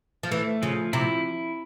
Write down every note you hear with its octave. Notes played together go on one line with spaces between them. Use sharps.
F3
E3 A3
C#3 F3
C3 E4